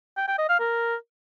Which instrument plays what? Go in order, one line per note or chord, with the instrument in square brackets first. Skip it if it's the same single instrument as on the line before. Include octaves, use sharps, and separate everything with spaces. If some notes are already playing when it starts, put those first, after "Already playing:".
[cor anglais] G5
G5
D#5
F5
A#4